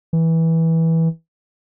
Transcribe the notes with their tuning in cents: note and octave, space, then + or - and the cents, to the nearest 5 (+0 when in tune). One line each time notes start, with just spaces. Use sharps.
E3 -15